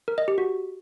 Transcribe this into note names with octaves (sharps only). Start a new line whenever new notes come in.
A#4
D#5
G4
F#4